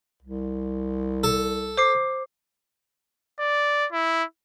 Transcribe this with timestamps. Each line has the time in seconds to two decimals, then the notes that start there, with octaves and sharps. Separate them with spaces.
0.22 C2
1.24 A4
1.77 C5 D6 C7
3.40 D5
3.92 E4